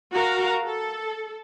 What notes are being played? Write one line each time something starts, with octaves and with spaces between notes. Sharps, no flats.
F#4 A#4 F5
A4